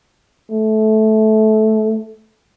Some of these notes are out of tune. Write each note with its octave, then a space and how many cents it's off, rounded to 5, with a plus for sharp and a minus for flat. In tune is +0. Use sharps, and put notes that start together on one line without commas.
A3 -15